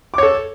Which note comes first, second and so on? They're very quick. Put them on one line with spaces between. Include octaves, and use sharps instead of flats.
D6 C#5 A4